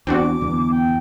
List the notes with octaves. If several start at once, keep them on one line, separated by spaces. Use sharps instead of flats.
E2 C4 D4 F#4 D6
E2 G2 D3 B3
G5